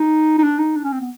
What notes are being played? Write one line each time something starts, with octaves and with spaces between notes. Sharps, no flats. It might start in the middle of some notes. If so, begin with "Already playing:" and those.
Already playing: D#4
D#4
D4
D#4
D4
C#4
C4
B3